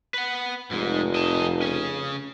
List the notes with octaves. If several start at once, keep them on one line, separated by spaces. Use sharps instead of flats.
B4 F#5
F1 G#2 G#3
F2 D#5 A5
C#4 G#4